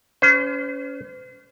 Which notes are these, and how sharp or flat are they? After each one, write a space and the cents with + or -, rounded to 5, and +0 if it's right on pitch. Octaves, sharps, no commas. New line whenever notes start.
C#4 +25 C5 -40